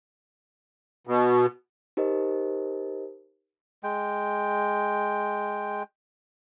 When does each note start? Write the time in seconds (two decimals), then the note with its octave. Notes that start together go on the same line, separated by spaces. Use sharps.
1.07 B2
1.97 D#4 G4 A#4 C5 D#5
3.83 G#3 G5